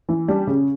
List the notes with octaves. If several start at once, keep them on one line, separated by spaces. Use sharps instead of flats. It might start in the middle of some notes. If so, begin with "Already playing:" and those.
E3
G3 D4
C#3